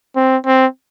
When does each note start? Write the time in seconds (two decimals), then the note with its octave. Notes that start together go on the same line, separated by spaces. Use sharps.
0.16 C4
0.46 C4